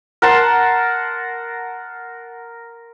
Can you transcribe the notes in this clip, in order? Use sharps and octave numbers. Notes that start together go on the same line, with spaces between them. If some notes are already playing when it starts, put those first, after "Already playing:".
A#4 F#5 A5 C6